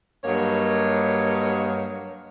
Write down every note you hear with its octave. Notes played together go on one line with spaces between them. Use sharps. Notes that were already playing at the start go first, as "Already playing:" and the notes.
G2 F#3 A#3 C#5 D#5